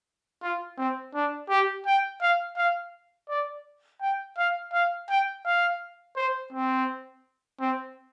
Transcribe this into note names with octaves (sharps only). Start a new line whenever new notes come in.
F4
C4
D4
G4
G5
F5
F5
D5
G5
F5
F5
G5
F5
C5
C4
C4